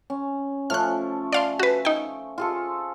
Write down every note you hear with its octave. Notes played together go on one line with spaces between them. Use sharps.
C#4
F3 A3 C#4 F6 F#6
D5 F5 C6
F#4 B4
D#4 G5
F4 G#4 A4